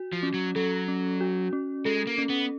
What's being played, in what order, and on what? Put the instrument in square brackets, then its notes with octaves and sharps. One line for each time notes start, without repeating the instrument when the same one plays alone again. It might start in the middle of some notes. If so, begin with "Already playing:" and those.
Already playing: [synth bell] F#4
[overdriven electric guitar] F3
[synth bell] C#4
[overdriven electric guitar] F#3
[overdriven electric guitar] F#3 [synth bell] A4
[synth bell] C#4
F#4
C#4
[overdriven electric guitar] G#3 [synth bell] A4
[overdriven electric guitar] A#3
[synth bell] C#4
[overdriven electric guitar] B3